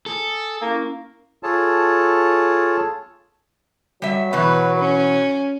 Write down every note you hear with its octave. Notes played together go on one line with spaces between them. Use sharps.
A4 G#5 D#6
A#3 C#4 E4
F4 G#4 A4 C#5 A5
F#3 G3 E5
B2 E3 F#4 B4
C#4